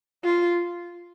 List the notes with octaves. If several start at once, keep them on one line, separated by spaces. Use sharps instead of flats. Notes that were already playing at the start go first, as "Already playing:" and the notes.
F4